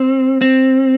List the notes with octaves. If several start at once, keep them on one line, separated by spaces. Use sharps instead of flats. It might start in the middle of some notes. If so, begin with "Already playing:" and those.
Already playing: C4
C4